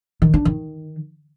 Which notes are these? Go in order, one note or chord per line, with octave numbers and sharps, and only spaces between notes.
D#3
D4
D#3